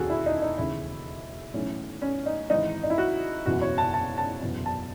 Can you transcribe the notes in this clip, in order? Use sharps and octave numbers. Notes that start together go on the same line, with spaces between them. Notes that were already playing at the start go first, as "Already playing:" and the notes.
Already playing: E1 D#2 D#3 F#4 G#4 A4
E4
D#4
D#4
E1 D#2 C#3 E3 E4
B1 A2 E3 C#4
C#4
D#4
G#1 G#2 E3 D#4
D#4
E4
F#4
F#1 E2 B2 F#4
C#5
A5
A5
A5
F#1 E2 B2
A5